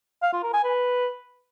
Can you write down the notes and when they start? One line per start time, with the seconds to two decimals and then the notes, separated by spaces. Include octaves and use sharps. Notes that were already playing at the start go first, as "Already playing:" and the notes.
0.23 F5
0.33 F4
0.43 A#4
0.54 G#5
0.64 B4